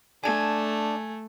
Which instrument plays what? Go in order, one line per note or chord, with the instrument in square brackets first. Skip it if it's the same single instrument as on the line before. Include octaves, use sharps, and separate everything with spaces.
[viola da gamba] A3 [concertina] D4 [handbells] G#5 G#6